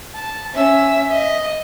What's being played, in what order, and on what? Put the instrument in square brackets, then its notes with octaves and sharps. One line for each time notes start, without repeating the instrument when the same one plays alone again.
[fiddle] A5
[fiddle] C#4 E6 [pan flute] E5
[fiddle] D#5